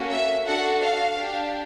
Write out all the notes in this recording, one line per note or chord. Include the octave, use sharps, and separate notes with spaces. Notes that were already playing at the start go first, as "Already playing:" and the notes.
Already playing: A#3 C#4 F#4 A4
E5
D4 F#4 A4 F#5
F5
D4 G4